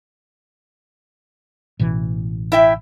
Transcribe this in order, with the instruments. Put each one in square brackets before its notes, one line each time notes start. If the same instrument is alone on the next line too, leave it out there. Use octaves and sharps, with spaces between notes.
[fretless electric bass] A1 B2 E3
[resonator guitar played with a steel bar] E4 E5 G5